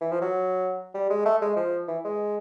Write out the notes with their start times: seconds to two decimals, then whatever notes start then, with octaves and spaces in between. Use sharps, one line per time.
0.01 E3
0.11 F3
0.21 F#3
0.94 G3
1.10 G#3
1.25 A3
1.42 G#3
1.56 F3
1.88 E3
2.04 G#3